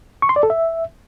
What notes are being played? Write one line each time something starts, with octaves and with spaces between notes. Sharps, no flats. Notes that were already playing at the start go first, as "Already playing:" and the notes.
C#6
C6
D5
A4
E5